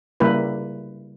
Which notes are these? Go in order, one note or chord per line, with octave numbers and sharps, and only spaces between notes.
C#3 G3 A#3 E4 B4